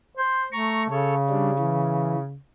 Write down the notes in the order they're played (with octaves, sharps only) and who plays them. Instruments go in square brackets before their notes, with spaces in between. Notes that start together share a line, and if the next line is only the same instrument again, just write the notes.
[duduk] C5
[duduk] A3 [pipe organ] A#5 C#6
[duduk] C#3 [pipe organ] A4 C#5
[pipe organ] G3 D4
E3